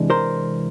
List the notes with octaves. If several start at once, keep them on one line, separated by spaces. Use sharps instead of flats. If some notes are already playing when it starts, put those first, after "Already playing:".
Already playing: C3 E3 G#3 D4
A#4 C5